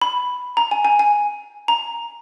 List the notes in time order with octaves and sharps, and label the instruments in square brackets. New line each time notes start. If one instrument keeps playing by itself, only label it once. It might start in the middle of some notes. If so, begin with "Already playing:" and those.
[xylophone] B5
A#5
G#5
G#5
G#5
A#5